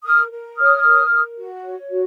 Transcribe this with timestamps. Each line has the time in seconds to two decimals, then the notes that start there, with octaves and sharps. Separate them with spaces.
0.05 A#4 D#6 F6
0.31 A#4
0.58 C#5 D#6 F6
0.85 A#4
1.11 A#4
1.38 F#4
1.64 C#5
1.91 F#4